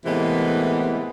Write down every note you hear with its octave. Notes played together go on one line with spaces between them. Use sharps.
A2 C3 E3 G#3 A#3 B3